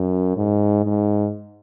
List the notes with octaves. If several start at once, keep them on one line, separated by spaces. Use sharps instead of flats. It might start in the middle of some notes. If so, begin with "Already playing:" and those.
Already playing: F#2
G#2
G#2